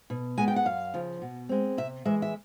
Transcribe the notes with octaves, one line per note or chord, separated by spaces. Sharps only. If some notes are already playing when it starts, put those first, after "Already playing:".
B2
G#3 B3 G#5
G5
F#5
F#2 F5
C#3 F3
B2
G#3 C4
C3 E5
E3 G#3 E5
E5